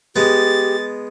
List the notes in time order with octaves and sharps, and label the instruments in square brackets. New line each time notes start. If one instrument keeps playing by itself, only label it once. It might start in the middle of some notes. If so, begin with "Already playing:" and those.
[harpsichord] G#3 B3 [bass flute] G4 [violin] A6